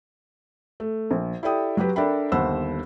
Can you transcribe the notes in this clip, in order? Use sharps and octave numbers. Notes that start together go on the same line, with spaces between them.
A3
A#1
E4 G4 A4 D5 G5 D#6
F#3 F#4 G4 B4
D4 A4 A#4 E5 G5 B5
G1 D#2 C5 F#5 B5 E6